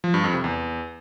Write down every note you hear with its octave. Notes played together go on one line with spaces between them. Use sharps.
F3
G2
F2
C3
E2